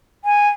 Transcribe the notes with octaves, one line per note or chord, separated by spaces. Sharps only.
G#5